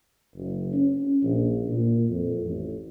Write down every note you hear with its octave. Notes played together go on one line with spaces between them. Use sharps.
F#1
C#4
A#1
A#2
F2
A1